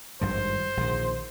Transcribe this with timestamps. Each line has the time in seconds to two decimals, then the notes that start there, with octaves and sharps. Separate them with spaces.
0.21 G#1 G2 F3 C5
0.77 A#1 D#3